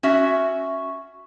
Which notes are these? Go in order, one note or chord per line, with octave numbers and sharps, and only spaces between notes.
C#4 F#4 E5